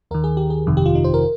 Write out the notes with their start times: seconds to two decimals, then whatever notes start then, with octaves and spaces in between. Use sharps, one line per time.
0.11 D#2 D#3 A#4
0.24 G#4
0.37 G4
0.50 G#4
0.67 G1 F2 C3 D#3
0.77 G4
0.86 F4
0.95 D#4
1.04 C5
1.14 A#4